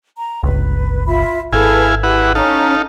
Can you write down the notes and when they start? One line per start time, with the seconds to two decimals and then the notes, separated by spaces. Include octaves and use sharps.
0.16 A#5
0.43 G1 C#2 B4
1.06 F4 E5 B5
1.53 G#1 E4 G#4 A4 B4 F5 G#5
2.03 E4 G4 G#4 B4 F#5
2.35 C#4 D#4 A4 F5 A#5